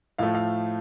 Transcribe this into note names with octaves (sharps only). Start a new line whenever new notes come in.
A2 F3 A3 F5
F5